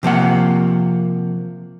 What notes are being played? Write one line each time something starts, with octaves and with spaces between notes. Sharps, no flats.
C3 F3 A#3 F#5